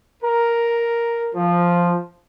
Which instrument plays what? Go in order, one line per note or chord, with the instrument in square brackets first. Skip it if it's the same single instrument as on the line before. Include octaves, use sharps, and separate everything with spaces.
[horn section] A#4
F3